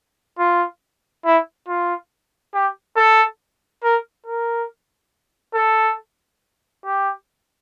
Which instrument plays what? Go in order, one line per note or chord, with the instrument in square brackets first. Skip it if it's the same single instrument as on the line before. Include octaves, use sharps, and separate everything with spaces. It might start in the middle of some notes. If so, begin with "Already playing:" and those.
[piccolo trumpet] F4
E4
F4
G4
A4
A#4
A#4
A4
G4